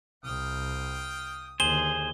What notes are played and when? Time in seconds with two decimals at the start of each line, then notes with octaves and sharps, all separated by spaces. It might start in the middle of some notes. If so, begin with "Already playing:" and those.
0.24 C2 F5 G5 D#6
1.60 D#2 D3 G#4 C5 G7